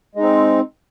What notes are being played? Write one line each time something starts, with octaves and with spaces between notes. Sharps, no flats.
G#3 C4 D#4